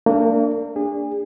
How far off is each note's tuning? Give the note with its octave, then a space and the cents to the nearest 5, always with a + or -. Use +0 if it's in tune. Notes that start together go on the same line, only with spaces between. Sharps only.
A#3 -35 D4 -5
D4 +0 G#4 -35